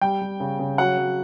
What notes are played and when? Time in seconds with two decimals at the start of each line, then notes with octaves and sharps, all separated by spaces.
0.01 G3 G5
0.21 G3
0.40 C#3
0.59 C#3
0.78 F#3 F#5
0.98 F#3